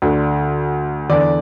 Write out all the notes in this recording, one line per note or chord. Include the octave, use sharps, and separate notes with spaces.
D2 D3
E2 D3 D5